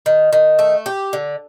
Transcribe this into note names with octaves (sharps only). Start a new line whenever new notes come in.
D#3
D#3
A3
G4
D3